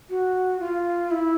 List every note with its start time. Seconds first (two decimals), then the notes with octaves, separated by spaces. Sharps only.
0.10 F#4
0.60 F4
1.11 E4